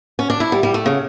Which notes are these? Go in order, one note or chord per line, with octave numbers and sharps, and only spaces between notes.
C#4
D4
E4
G3
G3
A3
C#3